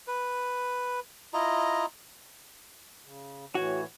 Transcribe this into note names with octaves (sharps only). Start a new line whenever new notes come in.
B4
E4 F4 D#5 A#5
C#3
A2 E3 F#4 C#5